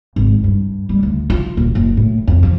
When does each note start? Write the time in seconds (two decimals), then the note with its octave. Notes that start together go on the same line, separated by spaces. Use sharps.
0.16 G#1
0.44 G2
0.89 G3
1.03 D2
1.30 F4
1.57 D#1
1.75 F#1
1.97 A2
2.27 F2
2.43 F3